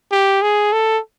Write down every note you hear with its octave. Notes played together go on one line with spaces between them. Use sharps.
G4
G#4
A4